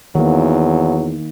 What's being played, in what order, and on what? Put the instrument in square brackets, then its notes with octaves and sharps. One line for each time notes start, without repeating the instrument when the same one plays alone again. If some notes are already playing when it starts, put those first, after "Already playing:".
[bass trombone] E2 [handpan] D#3 A#3 [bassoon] F#3